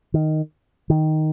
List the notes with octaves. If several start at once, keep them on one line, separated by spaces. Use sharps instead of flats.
D#3
D#3